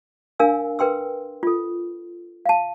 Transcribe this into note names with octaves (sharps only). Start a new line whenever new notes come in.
D4 A#4 F5 G#5 E6
A#4 B4 G5 C6 E6
F4 A4
F5 A5